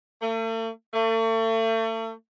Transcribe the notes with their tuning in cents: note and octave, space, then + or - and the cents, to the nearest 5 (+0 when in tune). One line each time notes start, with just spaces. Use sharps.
A3 +45
A3 +40